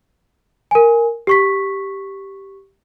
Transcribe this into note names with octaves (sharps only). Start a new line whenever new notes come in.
A#4 G#5
G4 C#6 B6